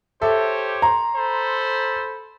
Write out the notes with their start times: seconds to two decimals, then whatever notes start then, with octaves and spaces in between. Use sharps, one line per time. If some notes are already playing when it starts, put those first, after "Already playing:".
0.21 G4 A4 C5 C#5 E5
0.82 A#5 C6
1.15 A4 C5 B5